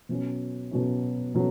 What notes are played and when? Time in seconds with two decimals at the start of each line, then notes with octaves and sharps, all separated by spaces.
0.09 B2 F#3 C#4
0.71 B2 F#3 C#4
1.35 B2 F#3 C#4